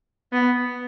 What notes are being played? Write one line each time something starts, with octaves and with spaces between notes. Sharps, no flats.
B3